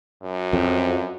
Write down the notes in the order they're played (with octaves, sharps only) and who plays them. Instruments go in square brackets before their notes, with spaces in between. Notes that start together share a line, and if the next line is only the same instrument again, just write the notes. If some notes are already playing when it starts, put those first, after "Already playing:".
[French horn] F#2
[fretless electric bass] F2